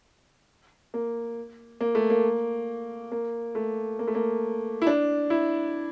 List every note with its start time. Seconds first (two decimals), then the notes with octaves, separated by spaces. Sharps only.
0.94 A#3
1.81 A#3
1.95 A3
2.10 A#3
3.12 A#3
3.55 A3
3.99 A#3
4.07 A3
4.15 A#3
4.82 E4
4.87 D4
5.30 E4